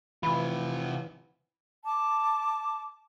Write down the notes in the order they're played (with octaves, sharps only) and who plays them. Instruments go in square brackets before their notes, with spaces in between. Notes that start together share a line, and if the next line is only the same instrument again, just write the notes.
[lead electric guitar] C3 F4 [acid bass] E3 [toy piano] B5
[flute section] A5 D6